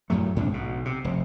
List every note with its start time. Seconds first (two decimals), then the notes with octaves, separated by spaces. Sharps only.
0.10 F#2 A2 F#3 A3
0.36 G#2 C3 C#4 D4
0.52 B1 B2
0.85 C3
1.04 F1